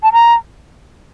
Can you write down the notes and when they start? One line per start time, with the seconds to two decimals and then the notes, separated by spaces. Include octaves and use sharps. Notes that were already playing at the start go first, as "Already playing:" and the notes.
0.03 A5
0.13 A#5